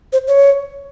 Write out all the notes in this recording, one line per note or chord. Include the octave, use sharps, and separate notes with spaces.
C5
C#5